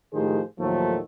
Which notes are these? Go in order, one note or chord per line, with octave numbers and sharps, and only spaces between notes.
A2 D#3 F3 G4 G#4 C5
D#2 A2 D#3 F3 F#3 A3